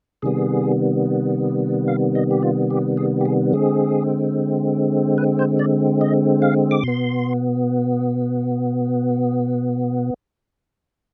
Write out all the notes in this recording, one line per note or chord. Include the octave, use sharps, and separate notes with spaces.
C3 D#3 G3 B3 G#4
F5
D#5
G4
F4
G4
G#4
G4
G#4
D3 G#3 C4 G#4
B4
C5
D5
D#5
F5
D6
B2 B3 C6